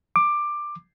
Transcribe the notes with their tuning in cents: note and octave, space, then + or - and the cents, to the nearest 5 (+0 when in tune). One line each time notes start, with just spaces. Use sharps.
D6 +15